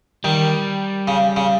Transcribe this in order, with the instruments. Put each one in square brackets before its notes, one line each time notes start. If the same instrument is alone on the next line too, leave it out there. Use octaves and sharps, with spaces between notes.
[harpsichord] D#3 [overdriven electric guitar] G3
[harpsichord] C#3
C#3